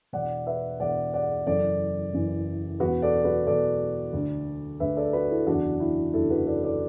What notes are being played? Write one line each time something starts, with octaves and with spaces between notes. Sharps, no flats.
E1 E2 B2 D5 F#5
B4 E5
E1 E2 B2 D5 F#5
D5 F#5
F#1 F#2 E3 A4 D5
F#1 F#2 E3
E1 E2 B2 F#4 B4
A4 D5
F#4 B4
E1 E2 B2 A4 D5
D2 D3
D2 D3 B4 E5
A4 D5
F#4 B4
E4 A4
F#1 E2 D3 D4 F#4
E4
F#1 E2 D3 E4 A4
F#4 B4
A4 D5
A4 D5